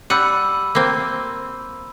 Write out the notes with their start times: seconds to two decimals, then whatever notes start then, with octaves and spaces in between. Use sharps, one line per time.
0.10 G3 F#5 B5 E6 D#7
0.75 A#3 C4